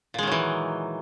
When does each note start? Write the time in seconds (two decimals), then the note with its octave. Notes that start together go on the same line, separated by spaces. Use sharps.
0.14 A#2
0.19 G#3
0.23 D#3
0.27 F#3
0.32 E3